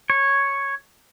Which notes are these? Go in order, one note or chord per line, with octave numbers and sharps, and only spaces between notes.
C#5